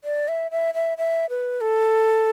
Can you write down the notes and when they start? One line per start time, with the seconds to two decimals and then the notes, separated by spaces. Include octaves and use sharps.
0.04 D5
0.28 E5
0.51 E5
0.74 E5
0.98 E5
1.30 B4
1.61 A4